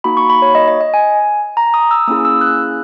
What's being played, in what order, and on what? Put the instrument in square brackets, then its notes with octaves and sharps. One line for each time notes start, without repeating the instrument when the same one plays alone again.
[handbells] A#3 D#4 F#4 B5
C#6
B5
C#5
D#5
D#5
D#5
G#5
A#5
D#6
E6
A#3 C#4 E4 G#4 D#6
E6
F#6